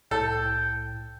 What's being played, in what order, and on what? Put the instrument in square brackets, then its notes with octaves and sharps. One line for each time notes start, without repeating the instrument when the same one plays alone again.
[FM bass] C2 [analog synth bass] A2 [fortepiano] A4 [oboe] G5